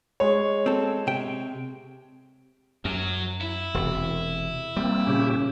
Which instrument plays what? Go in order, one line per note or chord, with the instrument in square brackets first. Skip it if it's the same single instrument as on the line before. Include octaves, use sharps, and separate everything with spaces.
[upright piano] G#3 C#5
[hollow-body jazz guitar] C4 A4
C3 G5
[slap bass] F#2 [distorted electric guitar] F#3
[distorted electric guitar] E4
[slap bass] E1 C3
[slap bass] G3 [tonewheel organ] A#3 C4
[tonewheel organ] A#2 C#4 G4 [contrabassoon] C#3